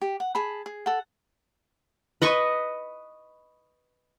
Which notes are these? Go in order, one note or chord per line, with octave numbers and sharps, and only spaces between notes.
G4
F#5
G#4 A5 B5
G#4
A4 F#5
B4 D#5 C#6